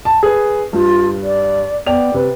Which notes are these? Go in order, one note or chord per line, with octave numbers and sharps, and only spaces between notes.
A5
G#4 B4
G2 F4
D5
B3 D5 G5 F7
C3 B4